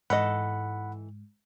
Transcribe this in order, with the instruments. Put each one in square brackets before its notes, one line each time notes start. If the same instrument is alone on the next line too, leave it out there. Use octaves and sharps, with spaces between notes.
[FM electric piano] G#2 [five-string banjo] E3 A4 D#5 [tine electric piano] F#5 B5